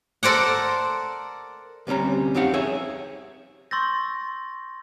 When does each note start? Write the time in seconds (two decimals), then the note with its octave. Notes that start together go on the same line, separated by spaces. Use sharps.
0.23 A4 A#4 C5 D5 F#5
1.87 D2 C3 G3 C#4 A#5
2.35 F2 C4 D#4 G4 F5 F#5
2.53 G#4 C#5 E5
3.71 C6 C#6 E6 G6 A6 A#6